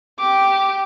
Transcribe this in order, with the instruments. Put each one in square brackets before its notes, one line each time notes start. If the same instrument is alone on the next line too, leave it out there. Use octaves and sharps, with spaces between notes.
[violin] G4 [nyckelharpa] D6